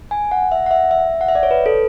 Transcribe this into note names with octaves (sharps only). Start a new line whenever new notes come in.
G#5
F#5
E5
F#5
E5
E5
F#5
E5
D5
C#5
B4
A4